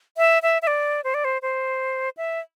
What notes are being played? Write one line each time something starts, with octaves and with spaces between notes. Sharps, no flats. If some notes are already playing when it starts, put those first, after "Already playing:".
E5
E5
E5
D5
C5
D5
C5
C5
E5